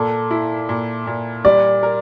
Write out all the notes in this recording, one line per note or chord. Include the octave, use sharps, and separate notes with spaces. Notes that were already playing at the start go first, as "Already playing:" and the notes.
Already playing: A#2 A4
E4
A#2
A#2
G3 D5
A#4